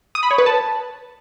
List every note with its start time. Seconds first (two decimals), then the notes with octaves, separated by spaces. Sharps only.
0.15 D#6
0.23 B5
0.31 C#5
0.38 B4
0.46 A5